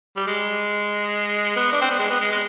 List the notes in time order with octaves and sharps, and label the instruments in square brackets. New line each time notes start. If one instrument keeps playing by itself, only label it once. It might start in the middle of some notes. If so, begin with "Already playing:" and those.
[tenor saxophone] G3
G#3
B3
D4
C4
B3
G#3
B3
G#3
G#3